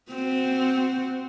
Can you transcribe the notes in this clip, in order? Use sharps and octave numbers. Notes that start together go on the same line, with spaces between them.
C4 F#4